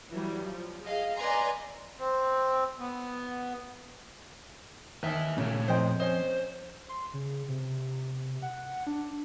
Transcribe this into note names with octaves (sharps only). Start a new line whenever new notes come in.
E3 F#3 G3
F3
G#4 D#5 F5
B4 D5 D#5 G#5 A#5 C6
C4
B3
D#2 D#3 B4 E5
A#2 C#3 A3 C#5
F2 C5 D#5 G5
C#4 C5 D#5
C6
C#3
C3
F#5
D4